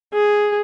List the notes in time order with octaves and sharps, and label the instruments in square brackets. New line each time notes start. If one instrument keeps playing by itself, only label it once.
[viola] G#4